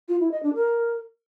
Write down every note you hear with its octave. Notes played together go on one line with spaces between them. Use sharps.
F4
E4
D#5
D4
A#4